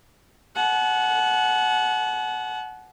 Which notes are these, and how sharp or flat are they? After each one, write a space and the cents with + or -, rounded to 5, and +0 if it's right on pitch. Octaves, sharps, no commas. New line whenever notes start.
F#5 +0 A5 -45